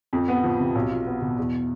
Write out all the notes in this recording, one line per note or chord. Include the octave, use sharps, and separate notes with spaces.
F2
B3
F3
C3
B1
F4
B3
B2
E2